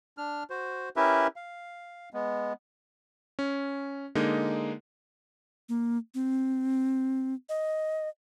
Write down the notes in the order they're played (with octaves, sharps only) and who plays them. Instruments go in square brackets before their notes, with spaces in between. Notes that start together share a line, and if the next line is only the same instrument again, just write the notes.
[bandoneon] D4 F6
F#4 C5
C#4 E4 G4 A#4 B4 E5
F5
G#3 B3
[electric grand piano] C#4
D3 G#3 A#3 D#4
[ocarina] A#3
C4
D#5